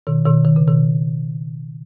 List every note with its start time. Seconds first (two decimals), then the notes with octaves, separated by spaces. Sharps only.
0.07 B2 D#3
0.26 B2 D#3
0.45 D#3
0.56 C#3
0.68 B2 D#3